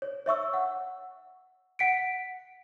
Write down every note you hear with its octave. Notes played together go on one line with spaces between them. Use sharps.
C#5
C#5 E5 C#6 E6
F#5
F#5 B6 C#7 D7